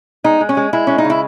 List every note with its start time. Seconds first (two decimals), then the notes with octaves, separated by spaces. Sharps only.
0.24 G#3 D#4
0.41 G#3
0.49 C#4
0.57 G#3
0.73 G#3 E4
0.87 G#3 C#4
0.98 D#4
1.04 C#3
1.10 E4